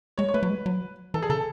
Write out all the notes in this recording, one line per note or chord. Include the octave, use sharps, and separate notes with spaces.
G#3 C#5
C#5
A3 B4
F#3
G#3
F#3
E3 A4
G#4
C#3 A4